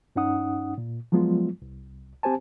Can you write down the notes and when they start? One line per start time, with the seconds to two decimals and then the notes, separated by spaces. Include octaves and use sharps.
0.16 G2 C#4 D#4 F#5 D#6
0.78 A#2
1.12 F3 F#3 G#3 B3 F4
1.62 C2
2.23 C4 G4 C5 G#5 A5